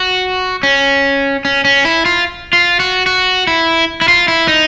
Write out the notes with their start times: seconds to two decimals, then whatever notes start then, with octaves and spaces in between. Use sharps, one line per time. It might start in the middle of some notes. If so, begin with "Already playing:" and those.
Already playing: F#4
0.63 C#4
1.45 C#4
1.65 C#4
1.85 E4
2.05 F4
2.53 F4
2.80 F#4
3.06 F#4
3.47 E4
4.01 E4
4.08 F4
4.28 E4
4.48 D#4